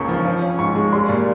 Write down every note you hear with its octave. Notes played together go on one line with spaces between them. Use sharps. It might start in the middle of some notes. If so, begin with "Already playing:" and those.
Already playing: C#2 C#3 A#3 C#4 C#6
F3
F3
C#4
G#2 C#6
G#3
G3 C6
A#2